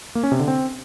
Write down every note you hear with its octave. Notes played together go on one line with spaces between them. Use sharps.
A#3
C#4
C3
D3
C4